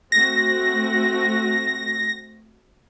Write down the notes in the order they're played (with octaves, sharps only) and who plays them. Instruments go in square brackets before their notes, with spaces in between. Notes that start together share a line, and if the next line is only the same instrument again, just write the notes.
[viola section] A3 C4 F#4 [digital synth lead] A#6